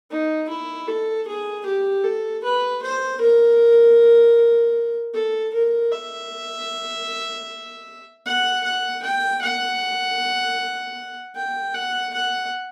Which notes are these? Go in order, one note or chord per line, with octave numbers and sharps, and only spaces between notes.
D#4
E4
A4
G#4
G4
A4
B4
C5
A#4
A4
A#4
E5
F#5
F#5
G5
F#5
G5
F#5
F#5